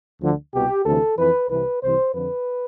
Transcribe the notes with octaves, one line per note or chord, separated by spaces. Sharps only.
D2 D3 F3
C2 B2 G4
D2 C3 E3 A4
F2 E3 B4
C2 C3 E3 B4
C2 C3 E3 C5
F2 D3 F3 B4